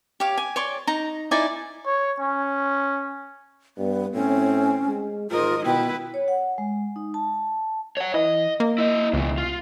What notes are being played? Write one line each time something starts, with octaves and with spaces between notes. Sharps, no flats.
G4 C#5 F5
G#5
C#5 D5 C6
D#4 A#5
D#4 E4 D5 G#5
C#5
C#4
G2 B3
A2 C4 C#4
G#3
G#2 F4 A#4 D#5
B2 E4 B4 G5
C#5
F#5
G#3
D#4
A5
C#5 F#5
E3 D#5
A#3
E4 D#5
C#2 B2 E3
F4